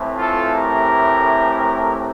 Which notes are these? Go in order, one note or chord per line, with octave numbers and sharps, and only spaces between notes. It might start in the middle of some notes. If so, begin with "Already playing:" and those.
Already playing: A2 E3 A3 C4
F4 A4
G4 A#4